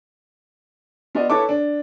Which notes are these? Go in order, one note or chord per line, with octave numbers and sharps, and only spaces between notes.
B3 F4 D5 D#5
E4 A4 B4 C#5 A5 D6
D4